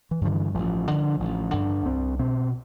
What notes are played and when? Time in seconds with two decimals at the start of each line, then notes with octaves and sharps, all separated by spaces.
0.11 E3
0.21 G2 D3 F3
0.33 E3
0.55 A1 F3
0.87 G2 D3
1.20 A1
1.53 G2 D3
1.86 C2 C4
2.19 B2 C4